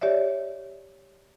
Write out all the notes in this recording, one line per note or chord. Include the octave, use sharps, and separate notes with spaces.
G4 C#5 D5 E5